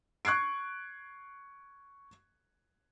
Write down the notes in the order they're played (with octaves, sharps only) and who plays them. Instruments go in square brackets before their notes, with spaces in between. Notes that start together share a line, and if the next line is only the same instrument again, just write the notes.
[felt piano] C#6 F#6 G#6 C7 D7